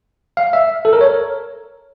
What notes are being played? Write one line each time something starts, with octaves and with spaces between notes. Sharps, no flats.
F5
E5
A4
A#4
C#5